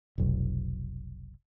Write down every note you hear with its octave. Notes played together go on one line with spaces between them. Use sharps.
F1 B1